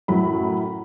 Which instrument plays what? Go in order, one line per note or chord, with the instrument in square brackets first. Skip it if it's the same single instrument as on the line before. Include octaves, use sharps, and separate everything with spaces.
[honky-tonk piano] F#2 A2 F#3 B5